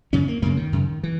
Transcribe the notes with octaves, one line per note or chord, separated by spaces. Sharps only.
F#2 C#3 C#4
A#3
F#2 C#3 A#3
D#3
F#2 C#3
E3